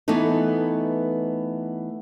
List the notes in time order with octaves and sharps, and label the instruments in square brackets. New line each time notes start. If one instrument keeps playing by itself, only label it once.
[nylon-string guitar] E3 A3 B3 D#4 A4 B4